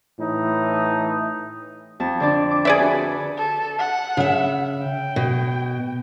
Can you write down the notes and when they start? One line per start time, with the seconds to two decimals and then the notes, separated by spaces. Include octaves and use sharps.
0.20 A2 E3 D#4
2.00 F2 A5
2.20 D3 D4 D5
2.51 D6
2.65 G#4 D5 E5
2.78 D4 F#4 B4
3.38 A4
3.79 F#5
4.17 C#3 E5
4.84 G5
5.16 B2